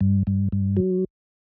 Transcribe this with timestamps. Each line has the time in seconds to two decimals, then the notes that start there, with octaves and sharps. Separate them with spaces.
0.01 G2
0.27 G2
0.52 G2
0.77 F#3